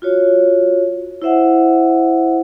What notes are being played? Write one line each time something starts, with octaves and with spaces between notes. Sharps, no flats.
F4 F#4 C#5
E4 C5 E5 F#5